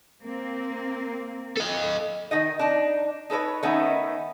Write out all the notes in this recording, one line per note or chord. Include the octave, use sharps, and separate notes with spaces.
A#3 C4
A4 D#5
D#3 D#4 D#5
D4 D#4
D#4 A4 B4 C#5
D#3 A3 B3 C#4 D#4